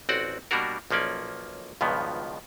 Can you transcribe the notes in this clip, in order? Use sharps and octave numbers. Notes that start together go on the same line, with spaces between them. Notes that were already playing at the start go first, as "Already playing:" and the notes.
A1 C4 F#4 D5 F#5
B2 G3 A#3 D4 F#4 A#4
B1 F3 A#3 C#4 D5
C#2 G2 B2 D#3 F3 B3